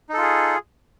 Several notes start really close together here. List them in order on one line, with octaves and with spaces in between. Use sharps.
D#4 A4 F4 G#4